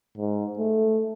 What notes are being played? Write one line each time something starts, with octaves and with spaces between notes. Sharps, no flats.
G#2
A3